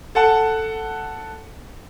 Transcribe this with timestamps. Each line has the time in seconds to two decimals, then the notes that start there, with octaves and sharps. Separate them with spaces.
0.15 A4 F#5 A5